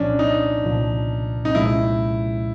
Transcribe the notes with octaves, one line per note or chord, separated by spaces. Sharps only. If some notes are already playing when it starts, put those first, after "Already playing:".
Already playing: C2 A#2 F3 C#4 D4
D#4
C2 A#2 F3
D#4
C2 A#2 F3 G#3 C#4 E4